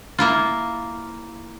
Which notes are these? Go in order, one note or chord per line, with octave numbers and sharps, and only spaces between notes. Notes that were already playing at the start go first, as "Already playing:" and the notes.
A#3 E4 F4